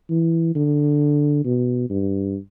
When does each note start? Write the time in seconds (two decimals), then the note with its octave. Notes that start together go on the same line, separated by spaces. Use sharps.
0.10 E3
0.55 D3
1.45 B2
1.90 G2